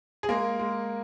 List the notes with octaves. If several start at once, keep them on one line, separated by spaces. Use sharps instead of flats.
G#4
G#3 A#3 A#4
G#3